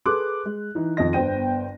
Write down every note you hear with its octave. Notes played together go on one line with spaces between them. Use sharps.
G#4 A4 B4 C6 D6 F#6
G#3
E3 D#4
F2 D#3 D#5 A#6
G1 B3 C5 G5 D#7